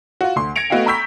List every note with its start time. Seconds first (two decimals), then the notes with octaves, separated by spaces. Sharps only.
0.21 F4 F#4
0.36 D2 C6
0.56 G#6 A#6 C#7 D7 F7
0.70 A3 B3 F#4 D#5 F5 G5
0.86 A#5 B5 C#6 E6 G6 B6